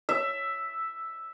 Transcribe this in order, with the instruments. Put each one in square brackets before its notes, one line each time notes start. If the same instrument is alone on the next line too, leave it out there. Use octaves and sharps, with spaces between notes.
[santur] E5